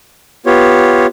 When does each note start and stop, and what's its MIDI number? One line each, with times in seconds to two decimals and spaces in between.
0.46 1.06 59
0.46 1.06 65
0.46 1.06 67
0.46 1.06 73